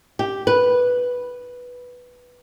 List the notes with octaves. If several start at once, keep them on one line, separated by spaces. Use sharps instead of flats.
G4
B4